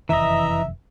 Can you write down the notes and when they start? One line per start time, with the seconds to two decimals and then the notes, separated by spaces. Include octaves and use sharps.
0.09 F1 F#2 D#3 E3 D#5 E5 A#5